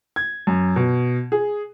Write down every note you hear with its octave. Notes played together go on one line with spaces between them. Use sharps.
G#6
F#2
B2
G#4